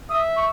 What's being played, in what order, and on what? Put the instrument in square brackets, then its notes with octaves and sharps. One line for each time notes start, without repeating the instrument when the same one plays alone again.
[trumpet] E5 [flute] D#6
[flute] C#6